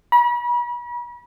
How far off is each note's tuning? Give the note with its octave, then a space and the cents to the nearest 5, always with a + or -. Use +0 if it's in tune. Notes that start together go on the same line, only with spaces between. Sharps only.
B5 -40